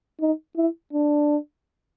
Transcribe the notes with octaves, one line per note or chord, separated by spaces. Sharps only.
D#4
E4
D4